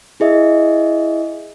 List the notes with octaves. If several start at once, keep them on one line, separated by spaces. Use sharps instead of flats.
E4 G#4 D#5 E5